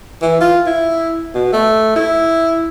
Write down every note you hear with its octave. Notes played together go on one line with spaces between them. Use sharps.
E3
F4
E4
B2
A3
E4